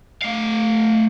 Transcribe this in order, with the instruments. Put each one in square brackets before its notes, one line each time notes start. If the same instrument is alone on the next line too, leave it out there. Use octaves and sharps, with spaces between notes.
[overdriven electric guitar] A3 F5